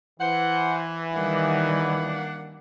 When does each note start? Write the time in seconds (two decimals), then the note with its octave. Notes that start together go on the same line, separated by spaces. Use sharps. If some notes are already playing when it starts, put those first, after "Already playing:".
0.20 E3 C5 F#5
1.15 D#3 G3 A#3 D4 F#5